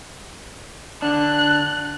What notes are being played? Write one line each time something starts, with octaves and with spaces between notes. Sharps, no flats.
D3 D4 F#6